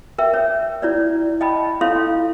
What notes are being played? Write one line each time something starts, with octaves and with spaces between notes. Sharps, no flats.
A#4 E5 G5
C#5
E4 C#5 D5
D#5 G5 A5 B5
E4 A4 C#5 F5 C6